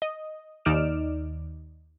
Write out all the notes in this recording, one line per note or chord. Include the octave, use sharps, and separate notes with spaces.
D#5
D#2 D#4 D5 F6 D7 E7